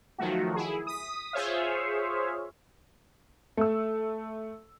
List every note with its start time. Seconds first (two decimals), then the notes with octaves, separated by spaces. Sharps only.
0.18 D#3 F3 F#3 A3 F#4
0.55 E4 G#4
0.87 D#6 B6
1.33 F4 G#4 C5 C#5 E5 F5
3.57 A3 E6